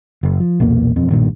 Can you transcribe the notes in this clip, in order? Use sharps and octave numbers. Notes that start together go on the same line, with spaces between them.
F#1
F3
B1 E2 A#2 A#3
E1 F2 C4
B1 G2 A#2 D#3